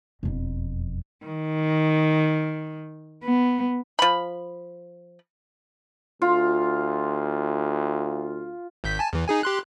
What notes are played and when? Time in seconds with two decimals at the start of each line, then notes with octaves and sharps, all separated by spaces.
0.23 E1 F2
1.25 D#3
3.24 B3
3.99 F3 B5
6.22 D2 F4
8.84 G#1 G6 B6
8.99 G#5 A5
9.13 E2 E3
9.28 D#4 G#4 G#5
9.43 G4 C6 F#6